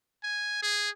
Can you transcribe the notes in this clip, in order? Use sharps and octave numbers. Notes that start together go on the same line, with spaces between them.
G#5
G#4